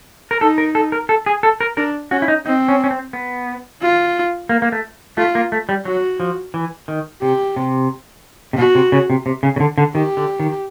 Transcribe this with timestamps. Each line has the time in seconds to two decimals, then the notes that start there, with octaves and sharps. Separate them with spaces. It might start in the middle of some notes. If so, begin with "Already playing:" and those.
0.31 A#4
0.41 D#4 A4
0.58 A#4
0.75 A4
0.92 A#4
1.09 A4
1.26 G#4
1.43 A4
1.61 A#4
1.77 D4 A#4
2.11 C#4 F#4
2.22 E4
2.28 D#4
2.46 C4 D#4
2.68 C#4
2.84 C#4
2.91 C4
3.13 B3
3.82 F4
4.49 A#3
4.62 A#3
4.72 A3
5.17 A3 F4
5.35 A#3
5.52 A3
5.69 G3
5.85 F#3 F#4
6.20 F3
6.54 E3
6.88 D#3
7.22 C3 G4
7.56 C3
8.53 C3
8.58 B2 F#4
8.75 C3
8.92 C#3
9.10 C3
9.26 C3
9.43 C#3
9.56 C#3
9.60 D3
9.78 D3
9.94 D#3 G4
10.17 D3
10.40 D#3